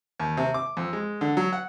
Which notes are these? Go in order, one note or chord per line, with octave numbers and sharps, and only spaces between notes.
D#2
C3
D6
F2
G#3
D3
F#3
F#5